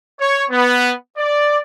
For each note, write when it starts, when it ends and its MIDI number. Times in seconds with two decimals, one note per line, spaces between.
0.21 0.44 73
0.50 0.92 59
1.18 1.59 74